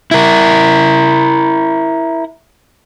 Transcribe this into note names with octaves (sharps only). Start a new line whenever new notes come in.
E4 A#4